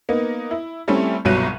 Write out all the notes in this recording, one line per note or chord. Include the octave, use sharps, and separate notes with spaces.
A#3 B3 D#4
E4
G3 A3 C4 C#4 E4
G1 C2 B2 F#3 F#6 D#7